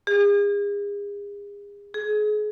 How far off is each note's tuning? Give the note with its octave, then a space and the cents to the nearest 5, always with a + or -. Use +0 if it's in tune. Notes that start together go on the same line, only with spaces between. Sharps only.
G#4 -40
G#4 +30